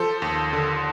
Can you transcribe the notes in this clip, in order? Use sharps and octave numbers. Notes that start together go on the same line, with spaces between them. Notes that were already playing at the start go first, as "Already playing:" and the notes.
Already playing: F3 A4 C5
D#2
D3